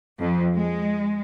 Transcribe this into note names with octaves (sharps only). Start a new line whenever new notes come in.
F2
G#3